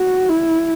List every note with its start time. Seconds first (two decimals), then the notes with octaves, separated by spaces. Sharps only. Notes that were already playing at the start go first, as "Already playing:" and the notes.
Already playing: F#4
0.28 E4